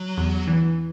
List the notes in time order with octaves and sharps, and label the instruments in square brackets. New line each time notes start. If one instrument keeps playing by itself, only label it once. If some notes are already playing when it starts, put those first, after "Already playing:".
Already playing: [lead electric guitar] F#3
[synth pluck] E2
E3